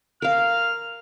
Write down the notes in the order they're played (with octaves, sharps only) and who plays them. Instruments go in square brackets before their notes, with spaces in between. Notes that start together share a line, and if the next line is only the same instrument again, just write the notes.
[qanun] A#4 F5 [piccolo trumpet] F6